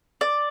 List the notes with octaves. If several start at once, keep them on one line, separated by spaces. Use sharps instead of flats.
D5